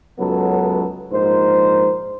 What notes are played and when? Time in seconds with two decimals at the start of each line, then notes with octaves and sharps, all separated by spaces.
0.19 C#2 F#2 F#3 B3 A4 B4
1.12 A#1 G#2 A#4 C5